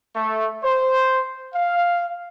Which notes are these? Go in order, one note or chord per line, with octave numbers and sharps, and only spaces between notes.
A3
C5
F5